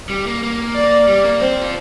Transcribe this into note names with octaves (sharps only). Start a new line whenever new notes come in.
G3
A#3
A#3
D5
G3
A#3
C4 C5
F4